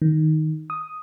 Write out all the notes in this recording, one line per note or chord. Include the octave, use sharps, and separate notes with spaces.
D#3
D#6